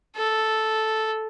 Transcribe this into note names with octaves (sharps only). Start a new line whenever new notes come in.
A4